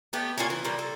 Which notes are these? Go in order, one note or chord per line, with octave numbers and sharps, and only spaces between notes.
A3 B3 G4
A#2 F4 C#5 G#5
E3
A#2 G3
A4